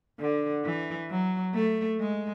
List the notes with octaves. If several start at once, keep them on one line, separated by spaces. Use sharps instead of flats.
D3
E3
F#3
A3
G#3